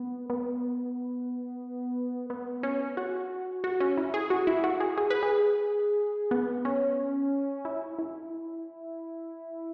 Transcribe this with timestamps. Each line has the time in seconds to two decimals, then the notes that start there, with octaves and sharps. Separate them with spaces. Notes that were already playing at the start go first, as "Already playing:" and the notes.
Already playing: B3
0.30 B3
2.30 B3
2.63 C#4
2.97 F#4
3.64 F#4
3.80 C#4
3.98 E4
4.14 G#4
4.30 F#4
4.47 E4
4.64 F#4
4.80 G#4
4.98 G#4
5.10 B4
5.23 G#4
6.31 B3
6.65 C#4
7.65 E4
7.99 E4